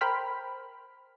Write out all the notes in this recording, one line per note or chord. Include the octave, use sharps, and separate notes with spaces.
A#4 C5 G5 B5 F6